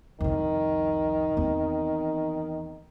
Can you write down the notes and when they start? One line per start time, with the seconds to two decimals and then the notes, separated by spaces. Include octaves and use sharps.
0.21 C2 F2 D#3
1.37 E2 C4